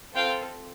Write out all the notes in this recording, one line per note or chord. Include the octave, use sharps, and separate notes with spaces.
C4 F4 A4 F5 G5